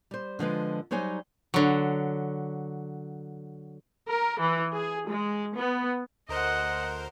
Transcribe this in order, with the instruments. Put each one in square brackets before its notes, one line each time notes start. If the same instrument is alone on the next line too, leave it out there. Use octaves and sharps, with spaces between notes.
[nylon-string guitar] G3 C5
D3 F3 G#3 B4
F#3 G3 D#4 C5 C#5 G#5
[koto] D3 F#3
[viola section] A#4
E3
G#4
G#3
B3
[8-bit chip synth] D2 A#4 C5 [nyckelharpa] D#5 F#5